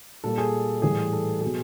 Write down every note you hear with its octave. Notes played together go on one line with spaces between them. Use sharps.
A#2 G3 A4
G#4
A2 E3 G3 G#4
A4
B2 F#3 G#4